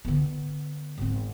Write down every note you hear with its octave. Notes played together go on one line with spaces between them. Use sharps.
D3 B3
G#1 C4